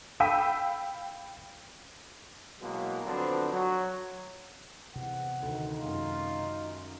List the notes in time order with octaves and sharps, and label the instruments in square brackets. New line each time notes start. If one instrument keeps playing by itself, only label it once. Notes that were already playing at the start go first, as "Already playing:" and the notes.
[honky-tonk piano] F5 G5 B5 E6 B6 D#7
[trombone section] B2 E3 F#3 G#3 A#3
D3 F3 F#3 B3 C4 D4
F#3
[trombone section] E2 [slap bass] C3 [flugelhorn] F#5
[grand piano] D2 D#3 [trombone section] D#4
[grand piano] F#2 D#3 G#3 [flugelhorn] F4